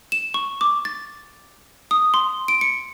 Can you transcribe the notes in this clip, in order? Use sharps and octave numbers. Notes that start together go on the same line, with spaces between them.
E7
C#6
D6
A6
D#6
C6
D7
C#7